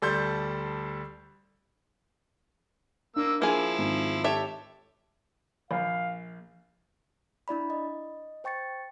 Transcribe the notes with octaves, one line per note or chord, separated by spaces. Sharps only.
D2 G3 A4 C6 G6
A#3 D4 E6
F3 A#3 E4 G#4
G#1
G4 A4 C#5 E5
A#1 F5
D4 E4 D5 B5
D#5
C5 G5 C#6 A6 C#7